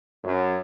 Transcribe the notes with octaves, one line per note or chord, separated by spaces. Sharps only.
F#2